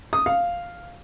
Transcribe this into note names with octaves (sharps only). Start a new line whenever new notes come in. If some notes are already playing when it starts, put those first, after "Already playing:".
D#6
F5